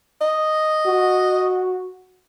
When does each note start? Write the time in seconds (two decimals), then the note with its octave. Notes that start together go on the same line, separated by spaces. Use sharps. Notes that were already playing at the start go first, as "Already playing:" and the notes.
0.21 D#5
0.86 F#4